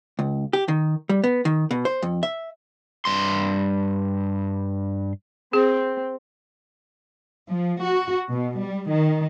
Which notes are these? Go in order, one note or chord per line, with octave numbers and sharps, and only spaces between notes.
C#2
G4
D#3
G3
B3
D#3
B2
C5
F2
E5
G2 C6
C4 G#4
F3
F#4
B2
G3
D#3